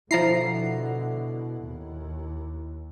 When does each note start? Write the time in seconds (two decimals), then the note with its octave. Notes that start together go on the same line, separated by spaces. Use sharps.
0.11 B2 D3 F3 E4 A#5 C7
1.63 D#2